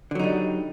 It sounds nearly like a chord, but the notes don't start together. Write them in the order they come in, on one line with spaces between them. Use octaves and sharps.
D3 F#3 D#4 G3